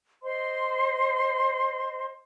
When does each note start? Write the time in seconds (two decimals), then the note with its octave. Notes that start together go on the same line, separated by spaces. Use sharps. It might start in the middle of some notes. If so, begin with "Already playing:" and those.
0.23 C5 D#5 C6